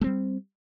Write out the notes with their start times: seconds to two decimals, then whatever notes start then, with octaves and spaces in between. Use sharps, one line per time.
0.01 A3
0.04 C4
0.06 G3